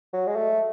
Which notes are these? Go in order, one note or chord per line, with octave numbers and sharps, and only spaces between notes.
F#3
G#3
A3